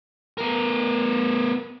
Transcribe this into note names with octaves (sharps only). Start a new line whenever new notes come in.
B3 A#4